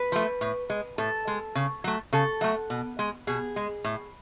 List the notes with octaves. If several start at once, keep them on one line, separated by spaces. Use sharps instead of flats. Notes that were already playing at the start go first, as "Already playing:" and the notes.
Already playing: B4
F3 A3
A2
G#3
A2 A4
G#3
C#3
F#3 A3
C#3 A4
F#3 A3
B2
G#3
B2 G#4
G#3
A2